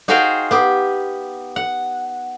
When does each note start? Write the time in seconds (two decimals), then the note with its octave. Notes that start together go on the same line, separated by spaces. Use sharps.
0.08 D#4 F#4 G#4 C5 F5 G5
0.51 B3 G4
1.56 F#5